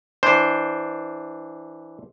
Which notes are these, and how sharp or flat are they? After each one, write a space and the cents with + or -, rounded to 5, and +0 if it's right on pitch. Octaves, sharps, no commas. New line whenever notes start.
E3 -10 D4 +0 C5 +0